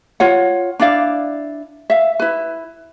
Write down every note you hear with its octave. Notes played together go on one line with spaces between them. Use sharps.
F4 C#5 F#5
D4 E4 D5 F5
E5 F5
E4 B4